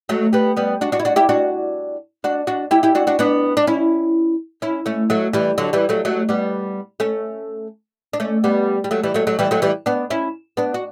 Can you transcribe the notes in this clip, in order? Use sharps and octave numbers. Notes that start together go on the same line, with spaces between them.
F#3 A3
G3 B3
G3 B3
D4 F#4
D4 F#4
E4
D4 F#4
E4 G4
D4 F#4
D4 F#4
D4 F#4
E4 G4
E4 G4
D4 F#4
D4 F#4
B3 D4
D4
C#4 E4
C#4 E4
A3 C#4
F#3 A3
E3 G3
D3 F#3
E3 G3
F#3 A3
F#3 A3
G3 B3
A3 C#4
D4
A3 C#4
G3 B3
G3
F#3 A3
E3 G3
F#3 A3
F#3 A3
E3 G3
F#3 A3
E3 G3
B3 D4
C#4 E4
B3 D4
F#4